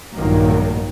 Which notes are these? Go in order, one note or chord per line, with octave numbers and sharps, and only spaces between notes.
A#1 G2 A#2 D#3 F#3 A#3